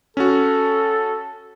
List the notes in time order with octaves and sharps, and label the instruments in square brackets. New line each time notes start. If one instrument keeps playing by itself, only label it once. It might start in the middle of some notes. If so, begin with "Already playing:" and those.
[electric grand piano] C#4 F#4 [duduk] A4